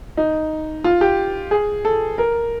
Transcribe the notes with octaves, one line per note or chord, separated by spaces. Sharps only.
D#4
F4
G4
G#4
A4
A#4